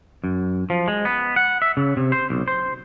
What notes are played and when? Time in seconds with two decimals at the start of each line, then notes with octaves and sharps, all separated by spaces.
0.24 F#2
0.70 F3
0.88 G#3
1.05 B3
1.36 F#5
1.62 E5
1.77 C#3
1.97 C3
2.12 C5
2.30 B1
2.48 C5